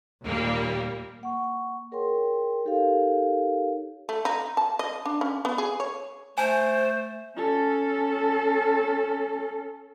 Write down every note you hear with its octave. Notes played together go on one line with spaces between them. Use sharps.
D#2 A#2 G3 A#3
A#3 F#5 C#6
G#4 A#4 C#5 G5 C6
D#4 G4 A4 A#4 C#5 F5
A3
D#4
A5
D#5
D4
C#4
B3
G#4
C#5
A3 C5 G#5 A5
C#4 A4